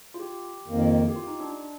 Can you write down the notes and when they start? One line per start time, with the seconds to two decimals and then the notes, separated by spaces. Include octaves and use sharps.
0.14 F4
0.20 G4
0.67 F2 D#3 A#3
1.08 G4
1.16 F4
1.27 D#4
1.40 D4
1.51 D4